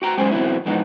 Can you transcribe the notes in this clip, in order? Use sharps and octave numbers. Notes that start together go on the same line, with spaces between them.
F#4 G5 A#5
F#2 G#3 C#4 G#4 C5 G#5
B2 E3 F#3 C4 E4
F2 B2 E3 G#3 B3 D#4